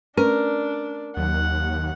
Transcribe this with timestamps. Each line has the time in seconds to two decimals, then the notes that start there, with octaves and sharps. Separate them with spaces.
0.17 A3 C#4 D4 A#4 B4
1.17 D#2 F#3 F#5